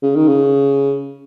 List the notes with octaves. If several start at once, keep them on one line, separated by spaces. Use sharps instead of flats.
C#3
D#3
C#3